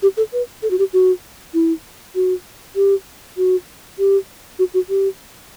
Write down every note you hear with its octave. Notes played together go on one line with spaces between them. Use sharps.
G4
A4
B4
A4
F#4
G4
F#4
E4
F#4
G4
F#4
G4
F#4
F#4
G4